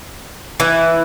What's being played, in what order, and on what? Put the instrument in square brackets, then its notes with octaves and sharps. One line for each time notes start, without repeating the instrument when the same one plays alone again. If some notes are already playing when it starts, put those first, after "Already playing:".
[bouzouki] E3 E4